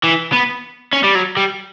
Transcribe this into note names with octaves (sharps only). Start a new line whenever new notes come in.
E3
B3
C#4
G3
F#3
G3